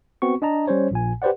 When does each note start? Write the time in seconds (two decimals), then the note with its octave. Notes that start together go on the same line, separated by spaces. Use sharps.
0.22 B3 C4 F#4 C#6
0.42 D4 D#5 A5 A#5
0.67 G3 C#4 C5 C#5
0.91 A#1 A#2 G#5
1.22 G4 B4 C5 D5 F#5